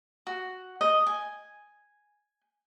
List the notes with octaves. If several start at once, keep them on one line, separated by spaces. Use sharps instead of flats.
F#4
D#5
G#5